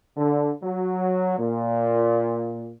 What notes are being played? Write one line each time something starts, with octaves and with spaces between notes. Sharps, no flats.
D3
F#3
A#2